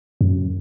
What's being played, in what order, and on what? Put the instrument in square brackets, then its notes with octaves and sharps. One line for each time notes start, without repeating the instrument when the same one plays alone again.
[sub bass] F#2